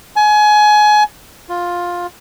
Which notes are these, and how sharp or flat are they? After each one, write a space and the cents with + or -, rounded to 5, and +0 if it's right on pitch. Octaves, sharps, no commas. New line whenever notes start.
G#5 +25
F4 +10